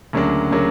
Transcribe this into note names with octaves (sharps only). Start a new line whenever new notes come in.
D2 C#3 F#3 A#3 D4
C#3 F#3 A#3 D4